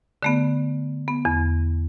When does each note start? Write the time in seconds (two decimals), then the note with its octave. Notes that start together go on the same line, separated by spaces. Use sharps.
0.23 D3 A3 B3
1.08 B3
1.25 E2